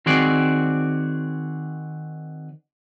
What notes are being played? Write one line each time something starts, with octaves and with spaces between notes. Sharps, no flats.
D#3 C4 F#4 G#4 D5